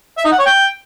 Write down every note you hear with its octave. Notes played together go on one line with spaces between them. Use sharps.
E5
D#4
F#5
C#5
G5